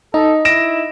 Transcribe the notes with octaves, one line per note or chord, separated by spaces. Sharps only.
D#4 A4 D#5
E4 A#6 D7 E7